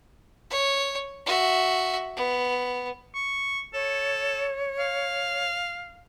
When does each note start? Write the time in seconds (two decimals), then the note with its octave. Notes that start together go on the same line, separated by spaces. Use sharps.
0.51 C#5
1.26 F#4 E5
2.17 B3
3.14 C#6
3.74 A4 C#5
4.79 F5